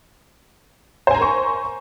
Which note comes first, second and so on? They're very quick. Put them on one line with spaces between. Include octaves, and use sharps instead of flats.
C5 G#5 A#5 A#4 C#6